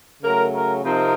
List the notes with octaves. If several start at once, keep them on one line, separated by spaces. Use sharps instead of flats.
C#3 F#3 A3 A#4
A#4
C3 F3 C4 D#4 A#4